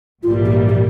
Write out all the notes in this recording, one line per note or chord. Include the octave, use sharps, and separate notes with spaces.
A#1 G#2 E3 G3 A#3 F4
G4
G4